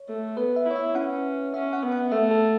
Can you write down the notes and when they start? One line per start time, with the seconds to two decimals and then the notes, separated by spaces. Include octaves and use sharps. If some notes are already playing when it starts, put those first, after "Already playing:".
Already playing: C#5
0.09 A3
0.37 B3 B4
0.56 E5
0.66 E4 C#5
0.76 E5
0.95 C#4 F#5
1.53 C#4 E5
1.73 F#5
1.83 B3
1.92 F#5
2.11 A3 E5
2.31 A4